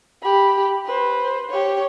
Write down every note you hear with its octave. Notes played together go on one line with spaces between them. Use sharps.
G4 B5
B4 C5
G4 C#5